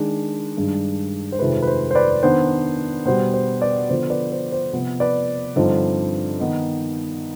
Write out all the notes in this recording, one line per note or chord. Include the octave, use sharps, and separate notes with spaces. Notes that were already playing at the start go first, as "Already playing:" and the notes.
Already playing: D#3 G#3 D4
G2 D#3 G#3 D4
C5
F2 C3 D#3 G#3 B4
B4
C5
C5
B4 D5
D#3 B3 D4 C5
B2 G3 B3 C5
C5
B4 D5
D3 F3 B3 C5
B4 D5
C5
C5
C3 F3 B3
B4 D5
G2 D3 F3 C4 D#4
D#3 B3 D#4